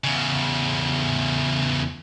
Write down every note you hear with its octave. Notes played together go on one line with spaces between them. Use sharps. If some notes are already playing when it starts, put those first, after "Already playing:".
E2 C#3